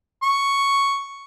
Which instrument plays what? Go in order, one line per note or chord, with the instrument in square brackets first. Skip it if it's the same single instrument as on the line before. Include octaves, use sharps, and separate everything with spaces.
[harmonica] C#6